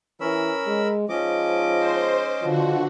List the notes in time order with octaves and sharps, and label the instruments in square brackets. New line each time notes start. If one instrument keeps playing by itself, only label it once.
[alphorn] E3 [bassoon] C#4 [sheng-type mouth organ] A#4 B5 E6
[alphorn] G#3
[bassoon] G#2 [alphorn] F3 [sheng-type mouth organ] C#4 D#5 D6
[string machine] C5
[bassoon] B2 [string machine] D3 F#4 [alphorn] F3